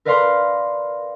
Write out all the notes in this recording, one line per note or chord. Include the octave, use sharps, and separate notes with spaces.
A#4 B4 D5 F5 A#5 C6